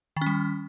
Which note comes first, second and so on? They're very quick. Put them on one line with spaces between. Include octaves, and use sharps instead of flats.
D#3 C#4 G3